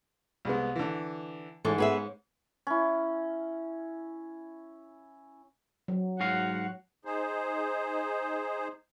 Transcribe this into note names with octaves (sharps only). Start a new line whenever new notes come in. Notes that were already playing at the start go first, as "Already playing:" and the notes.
C2 G#3 B3
D3 E3
G#2 E3 C#4 A4
B3 G#4 E5
C#4 E4
F#3
G#2 F#4 F5 F#5
D#4 G#4 C5